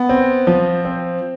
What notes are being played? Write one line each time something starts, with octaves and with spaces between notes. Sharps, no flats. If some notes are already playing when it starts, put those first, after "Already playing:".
Already playing: B3
C4
F3
C4